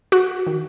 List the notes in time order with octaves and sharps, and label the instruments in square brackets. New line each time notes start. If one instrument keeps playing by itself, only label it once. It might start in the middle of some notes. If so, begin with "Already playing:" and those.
[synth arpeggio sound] F#4
D#3